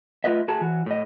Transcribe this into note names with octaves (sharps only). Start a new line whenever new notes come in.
A3 F4 B4 D#5 E5
A3 F#4 G#4 A5
E3 F#4
A2 D#5